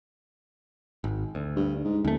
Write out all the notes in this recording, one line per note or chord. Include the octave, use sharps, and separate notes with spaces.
G#1
D2
G2
G#2
D#1 D2 A3